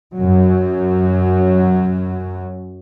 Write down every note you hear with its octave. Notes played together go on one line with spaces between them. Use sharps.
F#2 F#3